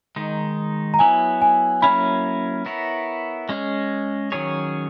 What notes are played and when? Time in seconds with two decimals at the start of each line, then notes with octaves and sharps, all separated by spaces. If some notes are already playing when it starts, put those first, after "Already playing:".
0.16 D#3 G#3 D#4
0.94 A#5
0.99 F#3 B3 E4 G#5
1.42 G#5
1.82 F#3 A#3 C#4 E4 B5
2.66 B3 E4 A#4 C#5
3.49 G#3 C#4 G#4
4.32 D#3 F#3 C#4 G#4 C#5